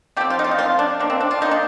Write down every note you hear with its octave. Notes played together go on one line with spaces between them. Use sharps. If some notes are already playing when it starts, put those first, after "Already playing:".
F3 C4 G4
F4
D#4
F4
D#4
F3 C4 F4
D4
D#3 A#3 D4
C4
D4
F4
D#3 A#3 D#4
D4